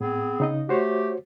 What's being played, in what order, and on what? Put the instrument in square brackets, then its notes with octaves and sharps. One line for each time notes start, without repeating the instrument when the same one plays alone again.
[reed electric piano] A2 [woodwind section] B3 C4 G#4
[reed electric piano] C#3 D#4 D#5
[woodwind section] A3 G4 [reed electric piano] F#4 C5 C#5